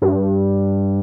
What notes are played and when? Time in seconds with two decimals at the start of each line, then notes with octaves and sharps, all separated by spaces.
0.02 G2